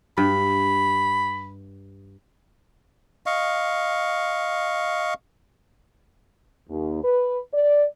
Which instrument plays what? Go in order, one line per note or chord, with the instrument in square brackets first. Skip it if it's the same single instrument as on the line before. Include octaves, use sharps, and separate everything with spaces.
[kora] G2 [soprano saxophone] B5
[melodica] D#5 F5 C#6
[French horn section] D#2
B4
D5